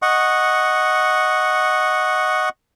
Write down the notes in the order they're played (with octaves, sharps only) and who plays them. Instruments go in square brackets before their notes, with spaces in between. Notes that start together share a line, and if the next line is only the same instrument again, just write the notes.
[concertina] D#5 F#5 C#6